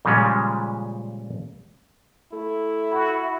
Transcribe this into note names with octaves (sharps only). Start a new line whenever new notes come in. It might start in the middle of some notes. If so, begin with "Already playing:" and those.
A#2 C#3 F3 G3 G#3 C#4
A3 E4
F#4 B5